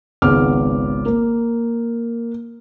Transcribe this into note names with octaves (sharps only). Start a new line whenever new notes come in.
G#1 C#2 B3 D6 F6
A#3